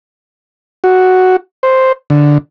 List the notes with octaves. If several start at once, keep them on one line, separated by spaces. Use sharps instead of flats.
F#4
C5
D3